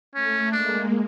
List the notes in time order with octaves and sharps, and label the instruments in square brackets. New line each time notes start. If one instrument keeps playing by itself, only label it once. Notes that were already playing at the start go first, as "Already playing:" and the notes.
[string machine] A3 [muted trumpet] C#4
[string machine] G#3 A#3 [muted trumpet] D4